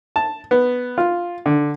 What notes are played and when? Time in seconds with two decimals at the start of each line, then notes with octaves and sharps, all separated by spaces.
0.16 A5
0.51 B3
0.98 F4
1.46 D3